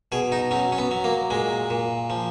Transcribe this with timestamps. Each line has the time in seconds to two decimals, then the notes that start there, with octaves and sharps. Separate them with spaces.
0.12 B2 G#4
0.32 D#4
0.51 F#3 C#4
0.72 C#4
0.78 B3
0.91 F#3
1.04 A#3
1.31 A#2 G#3
1.70 A#2
2.10 F3